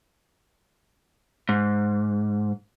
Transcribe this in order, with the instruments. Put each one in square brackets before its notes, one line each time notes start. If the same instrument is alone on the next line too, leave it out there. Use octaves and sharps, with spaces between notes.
[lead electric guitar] G#2